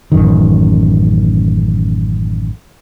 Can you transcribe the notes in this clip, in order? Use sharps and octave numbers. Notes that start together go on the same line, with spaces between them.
A1 F#2 D#3